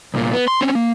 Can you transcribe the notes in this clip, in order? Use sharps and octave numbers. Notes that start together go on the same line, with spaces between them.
C2 A#2
B3
C6
C4 C#4
A#3